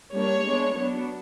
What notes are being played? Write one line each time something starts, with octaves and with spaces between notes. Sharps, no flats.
G3 A#3 D4 C#5
G#3 B3 D4
F#3 B3 D4